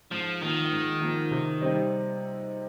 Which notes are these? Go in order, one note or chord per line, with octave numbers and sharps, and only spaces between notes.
G#2 F3
D#3 F3 A#3
G#2
F3 A#3
C3
G3 C4 D#4 G4